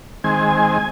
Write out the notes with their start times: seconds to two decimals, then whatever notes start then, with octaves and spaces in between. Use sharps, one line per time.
0.24 D#3 G#3 C4 G#5